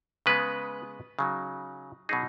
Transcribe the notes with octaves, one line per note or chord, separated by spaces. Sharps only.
C#3 G#3 B3 B4
C#3 F#3 D#4
B2 F#3 D#4 G#4